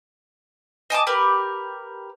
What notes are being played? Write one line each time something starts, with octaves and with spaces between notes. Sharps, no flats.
D#5 G#5 A5 D6
G4 A#4 B4